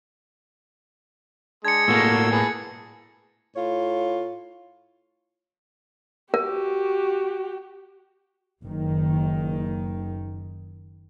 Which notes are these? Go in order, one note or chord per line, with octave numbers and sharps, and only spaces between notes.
G#3 D4 G#6 C#7
A2 A#3 F#4 A4 E6
G#4 B4 A5
A2 F4 C#5
F#4 G4 A#4
F#1 D#3